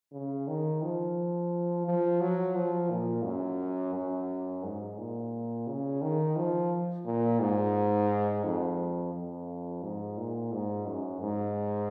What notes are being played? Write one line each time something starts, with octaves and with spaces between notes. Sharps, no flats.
C#3
D#3
F3
F3
F#3
F3
A#2
F#2
F#2
G#2
A#2
C#3
D#3
F3
A#2
G#2
F2
F2
G#2
A#2
G#2
F#2
G#2